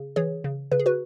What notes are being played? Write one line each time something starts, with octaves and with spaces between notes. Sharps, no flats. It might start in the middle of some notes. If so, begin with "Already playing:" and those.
Already playing: C#3
E3 G#4 C#5
C#3
C#3 B4
G#4
F#4 B4